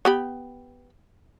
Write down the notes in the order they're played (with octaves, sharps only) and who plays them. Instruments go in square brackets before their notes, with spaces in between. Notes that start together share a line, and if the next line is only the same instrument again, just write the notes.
[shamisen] B3 G4 B5